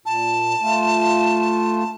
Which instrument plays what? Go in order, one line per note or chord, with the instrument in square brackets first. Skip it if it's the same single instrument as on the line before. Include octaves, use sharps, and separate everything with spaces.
[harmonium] A#2 [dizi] A5
[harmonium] A3 F4